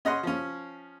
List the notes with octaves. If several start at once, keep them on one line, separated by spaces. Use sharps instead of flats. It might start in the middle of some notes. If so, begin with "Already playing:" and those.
C#4 D#5 F#5 C6
F3 C#4